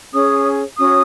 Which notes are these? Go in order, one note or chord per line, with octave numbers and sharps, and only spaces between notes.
C#4 G#4 C#5 D#6
C#4 F#4 C#5 D#6